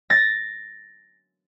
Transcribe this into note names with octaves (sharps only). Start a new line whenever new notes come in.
A6 A#6